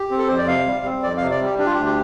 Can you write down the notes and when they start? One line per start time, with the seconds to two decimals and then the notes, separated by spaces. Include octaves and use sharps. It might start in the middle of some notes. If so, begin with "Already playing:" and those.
Already playing: G4
0.11 C4
0.18 A4
0.28 F2 C5
0.38 D5
0.48 C3 F5
0.66 G3
0.85 C4
1.03 F2 D5
1.17 F5
1.22 C3
1.31 D5
1.41 G3 G4
1.58 D4 G4
1.66 F4
1.74 G4
1.78 D2
1.86 G4